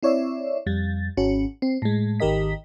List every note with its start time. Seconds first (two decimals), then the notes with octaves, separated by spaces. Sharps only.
0.03 C4 E4 C#5 D5 E5
0.66 F2 G3 A6
1.17 G#1 C#4 F#4
1.62 C4
1.82 A2 G#3
2.20 G#1 D#3 G4 A#4 D#5 B6